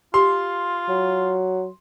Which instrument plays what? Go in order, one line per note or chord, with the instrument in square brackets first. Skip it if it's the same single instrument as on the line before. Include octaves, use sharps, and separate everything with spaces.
[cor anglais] F4 [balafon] G4 [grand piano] C6
[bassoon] F#3